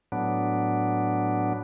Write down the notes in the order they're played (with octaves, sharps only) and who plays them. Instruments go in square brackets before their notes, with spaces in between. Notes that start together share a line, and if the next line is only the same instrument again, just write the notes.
[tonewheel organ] A2 F#3 B3 D4